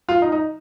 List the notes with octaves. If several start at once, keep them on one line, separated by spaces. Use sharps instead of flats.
F4
D#4
D#4